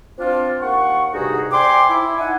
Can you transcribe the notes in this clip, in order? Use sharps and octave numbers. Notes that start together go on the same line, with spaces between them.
C4 D4 F4
D#2 A#3 F#5 C#6
D2 G2 C3 D#4 F#4 G#4
C5 D5 G5 G#5 C6 D6
E4
D#4 F#5 G#5